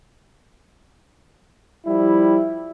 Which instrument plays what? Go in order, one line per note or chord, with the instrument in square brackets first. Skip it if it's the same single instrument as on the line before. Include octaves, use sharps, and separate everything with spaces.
[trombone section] F3 G3 E4